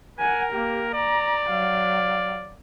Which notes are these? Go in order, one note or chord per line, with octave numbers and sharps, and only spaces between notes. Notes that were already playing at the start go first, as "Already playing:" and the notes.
A#4 F#5 G#5
A#3 G4
D5 A#5
F#3 F5